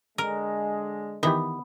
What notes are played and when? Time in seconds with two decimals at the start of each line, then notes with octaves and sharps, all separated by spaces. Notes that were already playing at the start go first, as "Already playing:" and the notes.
0.18 D3 G#3 A#4
1.23 D#3 E3 B3 G4